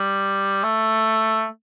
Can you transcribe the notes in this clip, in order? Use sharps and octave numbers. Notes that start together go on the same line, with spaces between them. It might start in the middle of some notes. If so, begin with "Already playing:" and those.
Already playing: G3
A3